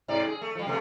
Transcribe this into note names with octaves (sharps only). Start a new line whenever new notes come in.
G#2 C3 D5
G#4
A3
F3 G3
C3 A3 B3